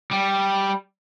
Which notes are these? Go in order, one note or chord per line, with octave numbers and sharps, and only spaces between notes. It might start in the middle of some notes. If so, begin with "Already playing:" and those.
G3